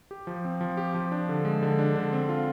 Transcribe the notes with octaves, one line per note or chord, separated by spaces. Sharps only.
G4
F3
C4
F3
G4
F3
D4
D3
G#3
D3
D4
D3
C4
F4